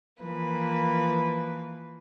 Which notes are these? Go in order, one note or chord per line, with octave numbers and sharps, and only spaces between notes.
E3 F3 A#3 B4